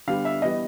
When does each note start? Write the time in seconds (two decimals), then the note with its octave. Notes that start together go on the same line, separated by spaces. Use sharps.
0.07 D3 G3 B3 F5
0.25 E5
0.42 E3 G3 B3 D#5